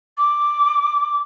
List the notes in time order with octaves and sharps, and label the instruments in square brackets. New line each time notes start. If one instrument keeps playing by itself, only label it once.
[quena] D6